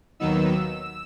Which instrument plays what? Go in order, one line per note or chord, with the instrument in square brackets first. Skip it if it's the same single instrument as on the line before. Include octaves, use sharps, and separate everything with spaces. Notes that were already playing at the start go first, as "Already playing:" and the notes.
[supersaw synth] D#2 D#3 F#3 B3 D#4 E6